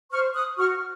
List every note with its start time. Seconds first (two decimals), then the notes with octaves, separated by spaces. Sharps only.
0.11 C5 C#6 F6
0.35 D#6 F#6
0.57 F#4 C#6 F6